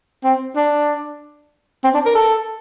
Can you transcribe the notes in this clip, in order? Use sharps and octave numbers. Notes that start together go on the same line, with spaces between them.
C4
D4
C4
D4
A#4
A4